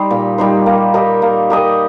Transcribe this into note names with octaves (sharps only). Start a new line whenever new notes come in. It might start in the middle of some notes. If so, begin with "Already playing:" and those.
Already playing: G3 D#4 C5
A#2
G3 D#4 C5
A#3
G4 A#4 D#5
A#3
G4 A#4 D#5